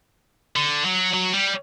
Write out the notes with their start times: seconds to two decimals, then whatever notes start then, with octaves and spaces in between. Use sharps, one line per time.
0.56 D3
0.85 F#3
1.14 F#3
1.33 G3